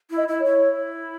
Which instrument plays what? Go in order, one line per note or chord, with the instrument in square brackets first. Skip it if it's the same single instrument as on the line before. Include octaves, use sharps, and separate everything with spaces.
[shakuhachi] E4
[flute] D#5
[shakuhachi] E4
[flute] C#5
[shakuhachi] E4